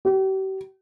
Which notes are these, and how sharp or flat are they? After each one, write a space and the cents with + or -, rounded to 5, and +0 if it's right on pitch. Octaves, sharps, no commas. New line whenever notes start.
G4 -40